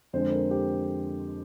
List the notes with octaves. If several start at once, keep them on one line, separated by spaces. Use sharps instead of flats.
F2 D3 G#3 C5
A#4
G4